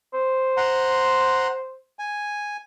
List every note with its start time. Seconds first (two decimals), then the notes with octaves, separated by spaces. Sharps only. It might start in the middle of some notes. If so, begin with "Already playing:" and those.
0.14 C5
0.57 F#5 A#5 C6
1.99 G#5